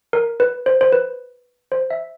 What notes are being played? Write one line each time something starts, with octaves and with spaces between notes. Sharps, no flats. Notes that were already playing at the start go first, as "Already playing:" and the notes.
A#4
B4
C5
C5
B4
C5
E5